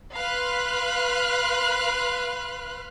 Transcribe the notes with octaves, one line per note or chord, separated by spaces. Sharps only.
B4 F5 B5 C6 F6 F#6